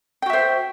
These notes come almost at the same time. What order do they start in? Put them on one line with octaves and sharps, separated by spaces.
G5 F#4 E5 C5